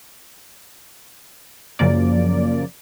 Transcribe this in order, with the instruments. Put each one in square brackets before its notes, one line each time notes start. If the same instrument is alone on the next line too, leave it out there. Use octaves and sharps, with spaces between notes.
[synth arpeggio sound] F#2 C#3 F3 A#3 D5